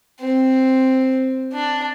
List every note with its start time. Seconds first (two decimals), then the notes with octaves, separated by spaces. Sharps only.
0.21 C4
1.53 D4